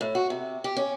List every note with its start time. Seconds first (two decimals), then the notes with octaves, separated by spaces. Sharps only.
0.01 A2
0.15 F#4
0.30 C3
0.64 G4
0.77 C#4